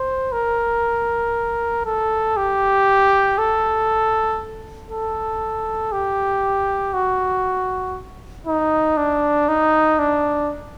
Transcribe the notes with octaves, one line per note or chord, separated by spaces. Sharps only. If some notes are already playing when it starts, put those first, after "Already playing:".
Already playing: C5
A#4
A4
G4
A4
A4
G4
F#4
D#4
D4
D#4
D4